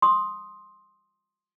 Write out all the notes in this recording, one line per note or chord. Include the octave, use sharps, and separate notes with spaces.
C6 D#6